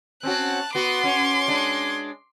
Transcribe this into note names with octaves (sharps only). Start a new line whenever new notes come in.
C4 C#4 F#4 A5 F#6
B3 F#4 C6 D6
C#4
G#3 D4